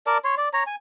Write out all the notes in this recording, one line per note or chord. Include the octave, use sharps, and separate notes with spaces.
A#4 D5 A5
C#5 C6
D5
C#5 A#5
G#5